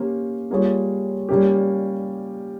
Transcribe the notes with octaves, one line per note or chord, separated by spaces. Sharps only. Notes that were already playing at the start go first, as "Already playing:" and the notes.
Already playing: A#3 C#4 G4 C5
G3 A#3 F4 G#4 C#5
A#2 G3 A#3 C#4 G4